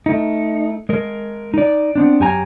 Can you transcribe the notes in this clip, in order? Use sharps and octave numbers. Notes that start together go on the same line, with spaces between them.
A3 D#4
G#3 A#4
D#4 D5
B3 C4 D4
F#2 G4 G#5 A#5